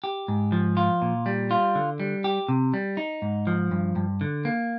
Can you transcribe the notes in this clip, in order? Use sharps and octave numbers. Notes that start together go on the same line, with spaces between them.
G4
G#2
F3
F4
A#2
G3
F4
D3
G3
G4
C3
G3
D#4
G#2
F3
G2
G2
D3
A#3